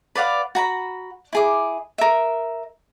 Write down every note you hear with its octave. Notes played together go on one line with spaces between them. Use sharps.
B4 D5 F5 F#5
F#4 A#5 B5
E4 G#4 D6
A#4 E5